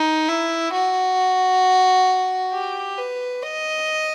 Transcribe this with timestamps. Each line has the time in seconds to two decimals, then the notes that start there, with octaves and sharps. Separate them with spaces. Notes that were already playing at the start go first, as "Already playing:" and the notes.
Already playing: D#4
0.28 E4
0.73 F#4
2.53 G4
2.98 B4
3.43 D#5